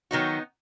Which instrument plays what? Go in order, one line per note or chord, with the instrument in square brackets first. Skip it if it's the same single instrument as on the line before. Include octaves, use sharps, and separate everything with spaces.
[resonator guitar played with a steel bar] D#3 F#3 B3 D#4 F#4